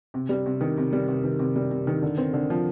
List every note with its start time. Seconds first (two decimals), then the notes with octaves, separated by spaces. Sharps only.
0.14 C3
0.29 G3
0.46 C3
0.61 D#3
0.78 C3
0.93 G3
1.08 C3
1.24 D#3
1.39 C3
1.56 G3
1.71 C3
1.87 D#3
2.02 D3
2.18 C4
2.33 D3
2.50 F3